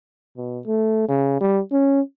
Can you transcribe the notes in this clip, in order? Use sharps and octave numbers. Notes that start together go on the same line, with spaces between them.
B2
A3
C#3
G3
C#4